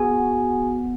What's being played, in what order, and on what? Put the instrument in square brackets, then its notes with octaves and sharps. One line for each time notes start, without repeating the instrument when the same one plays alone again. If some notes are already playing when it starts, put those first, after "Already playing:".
Already playing: [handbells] B3 F#4 G#4 G#5